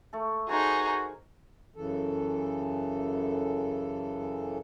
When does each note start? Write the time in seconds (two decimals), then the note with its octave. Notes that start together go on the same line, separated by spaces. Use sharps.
0.13 A3 A4
0.49 D#4 F#4 G#4 A#4 C5 G#5
1.75 F#2 C#3 E3 A4